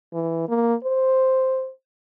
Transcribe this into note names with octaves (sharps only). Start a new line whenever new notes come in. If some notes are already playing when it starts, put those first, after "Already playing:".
E3
A#3
C5